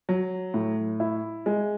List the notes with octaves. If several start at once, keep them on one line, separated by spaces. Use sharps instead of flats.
F#3
A2
E4
G#3